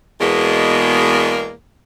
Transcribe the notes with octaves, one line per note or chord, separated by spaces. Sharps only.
E2 B2 G#3 A#3